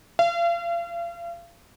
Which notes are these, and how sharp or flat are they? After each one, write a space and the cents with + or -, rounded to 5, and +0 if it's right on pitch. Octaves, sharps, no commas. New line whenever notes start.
F5 -40